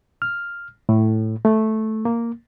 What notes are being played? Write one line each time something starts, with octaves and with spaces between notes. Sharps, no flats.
F6
A2
A3
A#3